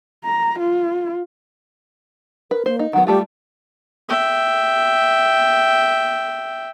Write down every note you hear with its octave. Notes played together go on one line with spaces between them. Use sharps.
A#5
F4
A#4 B4
A#3 C5
D#4
D#3 F#3 B3 F#5
G3 A3 F4 G4
E5 G5